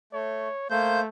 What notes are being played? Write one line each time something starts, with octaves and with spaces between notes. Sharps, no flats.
A3 C#5
A3 A#3 C5 G6